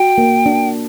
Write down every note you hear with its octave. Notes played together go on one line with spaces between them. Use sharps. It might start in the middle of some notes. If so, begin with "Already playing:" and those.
Already playing: F#4 G5
A#3
D4